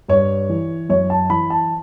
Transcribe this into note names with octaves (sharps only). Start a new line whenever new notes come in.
G2 C#5
E3
F#2 C#5
A5
E3 B5
A5